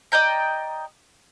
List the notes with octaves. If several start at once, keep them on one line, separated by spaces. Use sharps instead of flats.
D5 D#5 G5 A#5